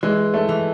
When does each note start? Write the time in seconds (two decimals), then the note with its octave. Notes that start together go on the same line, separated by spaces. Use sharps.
0.03 E3 G#3
0.34 A3
0.49 E3